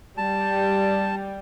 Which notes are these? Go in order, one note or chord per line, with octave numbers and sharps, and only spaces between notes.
G3 A5